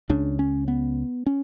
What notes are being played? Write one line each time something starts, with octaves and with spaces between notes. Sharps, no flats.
C#2 C#3 D4
C#4
B3
C#4